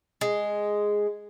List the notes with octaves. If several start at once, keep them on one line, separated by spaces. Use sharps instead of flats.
G#3